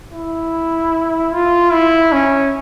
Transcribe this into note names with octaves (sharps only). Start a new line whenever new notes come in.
E4
F4
E4
C#4